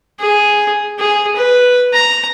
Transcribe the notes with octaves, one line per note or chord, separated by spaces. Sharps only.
G#4
G#4
B4
A#5